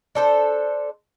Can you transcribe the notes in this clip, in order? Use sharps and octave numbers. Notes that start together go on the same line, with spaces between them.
D4 A4 C5